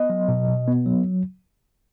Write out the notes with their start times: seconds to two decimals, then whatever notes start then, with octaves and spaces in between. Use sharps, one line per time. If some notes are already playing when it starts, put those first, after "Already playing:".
Already playing: B3 D#5
0.10 F#3
0.29 B2
0.48 B2
0.68 B3
0.86 F#3